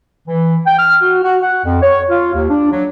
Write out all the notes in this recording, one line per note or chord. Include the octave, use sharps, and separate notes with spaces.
E3
G5
F6
F#4
F#4
F#5
F2
C#5
F4
D#2
D4
F#3